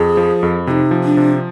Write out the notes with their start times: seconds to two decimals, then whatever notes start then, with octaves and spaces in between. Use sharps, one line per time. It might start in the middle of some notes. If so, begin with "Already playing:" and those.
Already playing: F2 G#4
0.17 F3
0.43 F2
0.67 C3 D#4 F4
0.91 F3
1.04 D4
1.17 C3